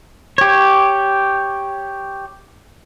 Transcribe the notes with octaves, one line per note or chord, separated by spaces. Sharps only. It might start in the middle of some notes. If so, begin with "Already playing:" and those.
G4 C#5